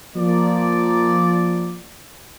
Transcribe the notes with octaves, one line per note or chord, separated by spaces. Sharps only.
F3 A#3 D5